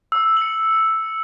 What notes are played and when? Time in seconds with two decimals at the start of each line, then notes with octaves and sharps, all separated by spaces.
0.12 E6
0.37 C#7 F#7